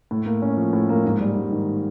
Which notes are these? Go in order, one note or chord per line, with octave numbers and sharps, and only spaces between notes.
A2
A#3
C#4
F3
A2
A#3
G#2
G3
G#2
D#3